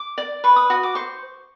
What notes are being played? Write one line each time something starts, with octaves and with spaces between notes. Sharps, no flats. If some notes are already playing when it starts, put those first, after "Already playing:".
Already playing: D6
D5
B4 C#6
D#6
F#4 D#6
D6
C5 C#6